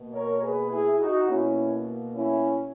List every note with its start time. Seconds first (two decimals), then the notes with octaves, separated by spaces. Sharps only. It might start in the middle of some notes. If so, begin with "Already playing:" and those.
Already playing: B2 A#3
0.13 A#4 C#5
0.42 G#4 B4
0.71 E4 G#4
0.99 D#4 F#4
1.28 B2 A#3 C#4 E4
2.14 C#4 E4